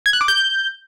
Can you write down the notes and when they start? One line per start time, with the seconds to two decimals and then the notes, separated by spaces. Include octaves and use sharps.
0.06 G#6
0.13 F#6
0.21 D6
0.28 G6